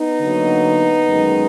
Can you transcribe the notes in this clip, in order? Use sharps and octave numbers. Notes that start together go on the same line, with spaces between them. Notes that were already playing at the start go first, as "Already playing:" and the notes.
Already playing: B3 D#4
D3 F#3 A#3
F#2 D#3 G#3